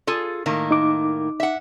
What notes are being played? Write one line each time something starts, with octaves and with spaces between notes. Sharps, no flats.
F4 G#4 A4
A2 D#3 A#3
D#4 D6
E5 F#5